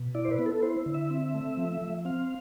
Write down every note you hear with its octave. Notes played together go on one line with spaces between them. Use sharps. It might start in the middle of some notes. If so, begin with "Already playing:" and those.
Already playing: B2
E4 D5
C5
B4
B3
A4
E4 C5
D3
E5
C4
A3
F3
F3
C4 F5